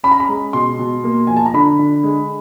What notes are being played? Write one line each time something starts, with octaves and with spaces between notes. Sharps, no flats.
C#4 B5
A#5
B5
G#3
B2 C6
B2
A#3
F3 G#5
A5
A#5
D3 B5
D3
G#3